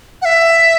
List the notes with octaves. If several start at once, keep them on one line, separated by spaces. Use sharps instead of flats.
F#5
E5